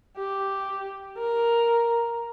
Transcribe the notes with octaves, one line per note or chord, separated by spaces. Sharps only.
G4
A#4